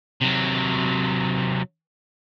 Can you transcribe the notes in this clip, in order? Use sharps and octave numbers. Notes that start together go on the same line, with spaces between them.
C3 F#3